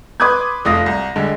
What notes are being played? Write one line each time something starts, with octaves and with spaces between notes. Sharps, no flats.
B4 C6 D6 D#6 F#6 G#6
F1 A3 F4 D#6 A#6
C2
G2 D3 G#3